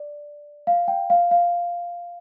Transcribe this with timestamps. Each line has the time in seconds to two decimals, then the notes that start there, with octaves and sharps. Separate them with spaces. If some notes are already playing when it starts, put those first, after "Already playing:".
Already playing: D5
0.67 F5
0.88 G5
1.10 F5
1.31 F5